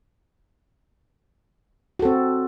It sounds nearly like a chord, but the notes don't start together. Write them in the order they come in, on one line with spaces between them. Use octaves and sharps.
F#4 A4 C4